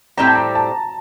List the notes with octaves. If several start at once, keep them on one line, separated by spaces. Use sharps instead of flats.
A2 G3 C4 G4 C5 A#5
A5
A#5
A5